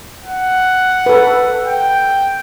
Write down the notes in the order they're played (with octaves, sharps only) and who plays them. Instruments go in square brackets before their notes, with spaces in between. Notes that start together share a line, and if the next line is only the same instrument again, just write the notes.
[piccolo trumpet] F#5
[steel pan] A4 B4
[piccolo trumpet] G5